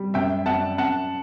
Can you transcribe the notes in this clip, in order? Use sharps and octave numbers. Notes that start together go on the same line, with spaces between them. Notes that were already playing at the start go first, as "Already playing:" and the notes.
Already playing: G3
F#2 E5 G5
F#2 F#5 A5
F#2 F#5 A5